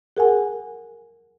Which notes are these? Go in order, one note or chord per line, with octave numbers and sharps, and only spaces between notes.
G#4 A#4 F#5 G#5